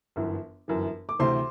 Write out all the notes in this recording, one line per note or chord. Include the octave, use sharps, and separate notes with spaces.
G1 F#2 E3
G1 F#2 E3
D6
D2 C3 E3 C5 C6